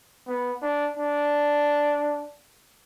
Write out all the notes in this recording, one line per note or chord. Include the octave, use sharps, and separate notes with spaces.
B3
D4
D4